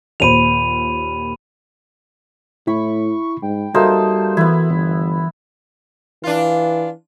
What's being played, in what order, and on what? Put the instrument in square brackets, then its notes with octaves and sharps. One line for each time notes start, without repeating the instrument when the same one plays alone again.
[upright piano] D#2 A#2 C5 [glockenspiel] B5 D#7 F7
[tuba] A2 [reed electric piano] E4 [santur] B5 [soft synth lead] C#6
[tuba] G#2 [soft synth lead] G5
[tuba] G3 [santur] A#3 D#4 C5 [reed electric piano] F#4 A4 E5 [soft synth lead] A5
[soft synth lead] E3 [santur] B3 E4
[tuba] G1
[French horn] E3 [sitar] D4 F4